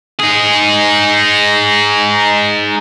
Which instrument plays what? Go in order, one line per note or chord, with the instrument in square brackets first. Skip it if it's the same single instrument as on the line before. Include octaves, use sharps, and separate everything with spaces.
[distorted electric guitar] D#4 G#4